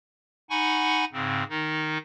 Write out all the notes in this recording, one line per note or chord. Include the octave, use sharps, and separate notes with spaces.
D#4 F#5 G#5 B5 C#6
G#2 C#3 C4
D#3 D#4